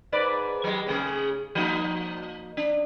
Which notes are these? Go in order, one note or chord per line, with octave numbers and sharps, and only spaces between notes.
G#2 B4 D5
F#3 G#3
C#3 A3 G#4
F3 A#3 D#4
D4